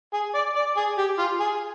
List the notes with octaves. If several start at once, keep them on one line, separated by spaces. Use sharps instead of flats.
G#4
D5
D5
G#4
G4
F4
G#4